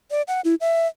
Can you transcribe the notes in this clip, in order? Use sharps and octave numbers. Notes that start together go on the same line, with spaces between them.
D5
F#5
E4
E5